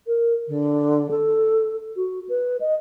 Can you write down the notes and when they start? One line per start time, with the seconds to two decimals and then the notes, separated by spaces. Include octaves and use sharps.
0.07 A#4
0.47 D3
1.10 A4
1.96 F#4
2.28 B4
2.60 D#5